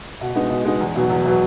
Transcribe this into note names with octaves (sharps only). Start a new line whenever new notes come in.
B2
G#3 B3 D#4
B2
G#3 B3 D#4
E2
B2 F#3 B3
E2
B2 F#3 B3